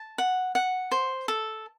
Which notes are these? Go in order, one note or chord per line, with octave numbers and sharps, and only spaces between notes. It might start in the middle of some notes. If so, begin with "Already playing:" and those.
Already playing: A5
F#5
F#5
C5
A4